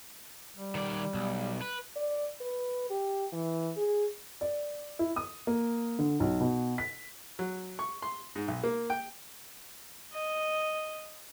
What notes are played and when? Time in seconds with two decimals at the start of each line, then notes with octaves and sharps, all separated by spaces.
0.56 G3
0.75 D#3 D5
1.14 B1
1.62 B4
1.96 D5
2.41 B4
2.90 G4
3.33 E3
3.77 G#4
4.41 D5
4.99 E4
5.16 D#6
5.47 A#3
5.99 D3
6.20 B1
6.41 B2
6.78 B6
7.39 F#3
7.79 C#6
8.02 C6
8.36 G#2
8.48 B1
8.64 A#3
8.90 G5
10.13 D#5